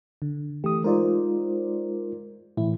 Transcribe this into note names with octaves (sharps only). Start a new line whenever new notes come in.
D3
E3 A3 G4 D#6
G#3 D#4 F4 A#4 C5 D5
A2 E3 E4